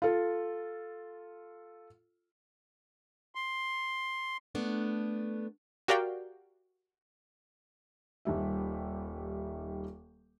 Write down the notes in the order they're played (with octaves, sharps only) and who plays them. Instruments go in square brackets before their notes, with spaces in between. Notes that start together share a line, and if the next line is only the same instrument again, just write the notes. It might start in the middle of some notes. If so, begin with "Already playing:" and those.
[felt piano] F4 A4
[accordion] C6
[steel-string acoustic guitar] A3 B3 D4
[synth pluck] F#4 G4 A#4 D5 F5 G5
[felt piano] D#1 D#3 G3 E5